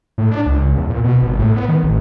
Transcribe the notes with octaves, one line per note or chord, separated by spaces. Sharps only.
A2
D4
C#2
C#2
E2
A#2
B2
G#1
A2
B3
D#3
A1